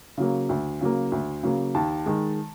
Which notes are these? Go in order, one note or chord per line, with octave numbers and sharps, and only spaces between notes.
C#3 F#3 A#3
D2
C#3 F#3 A#3
D2
C#3 F#3 A#3
D#2 A5
D#3 G#3